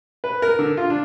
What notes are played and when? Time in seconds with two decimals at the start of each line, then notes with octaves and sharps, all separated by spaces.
0.24 B4
0.42 A#4
0.59 D3
0.77 F4
0.90 D4